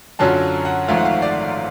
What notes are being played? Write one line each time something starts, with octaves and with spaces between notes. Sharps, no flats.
F#2 D3 F#3 C#4 F4 A5
F#5
G#1 G#2 F3 A3 F4 F5
F#5
F5
D5